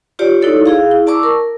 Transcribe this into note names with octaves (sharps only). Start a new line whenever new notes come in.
F4 G4 C#5 D5
D#4 E4 F#4 A4 C#5 D5
E4 G#4 F5
E4
D5 A5 A#5 C#6 D6 E6
A#4